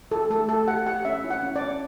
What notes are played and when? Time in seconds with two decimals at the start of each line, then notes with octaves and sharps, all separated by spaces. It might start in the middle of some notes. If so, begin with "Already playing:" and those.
0.11 E4 A4
0.30 A3 A4
0.49 E4 A4
0.67 G4 F#5
0.86 G4 F#5
1.05 C#4 E5
1.24 E4
1.30 F#5
1.42 C#4
1.56 D5
1.61 C#4